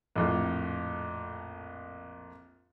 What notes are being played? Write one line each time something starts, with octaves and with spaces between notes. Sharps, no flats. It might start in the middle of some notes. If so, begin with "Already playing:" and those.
A#1 F2 A2